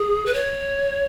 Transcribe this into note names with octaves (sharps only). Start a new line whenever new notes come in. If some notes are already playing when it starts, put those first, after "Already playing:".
Already playing: G#4
B4
C#5